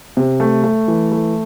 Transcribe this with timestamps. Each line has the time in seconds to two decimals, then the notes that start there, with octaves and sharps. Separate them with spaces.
0.17 C3
0.40 A3
0.64 A3
0.88 E3
1.11 A3